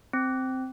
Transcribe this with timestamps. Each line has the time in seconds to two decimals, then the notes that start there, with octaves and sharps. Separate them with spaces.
0.13 C4